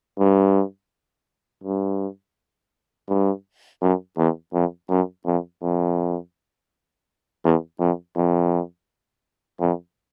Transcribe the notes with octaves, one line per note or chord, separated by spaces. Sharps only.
G2
G2
G2
F#2
E2
F2
F#2
F2
F2
E2
F2
F2
F2